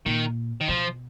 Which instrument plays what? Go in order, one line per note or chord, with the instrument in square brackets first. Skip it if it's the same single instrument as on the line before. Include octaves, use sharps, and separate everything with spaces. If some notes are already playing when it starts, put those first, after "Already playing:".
[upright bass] A#2 [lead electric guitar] D#3
[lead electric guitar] D#3
[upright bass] B2 [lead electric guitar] F3